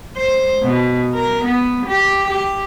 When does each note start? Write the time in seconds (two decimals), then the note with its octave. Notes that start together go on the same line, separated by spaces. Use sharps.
0.17 C5
0.63 B2
1.15 A#4
1.45 B3
1.87 G4
2.31 G4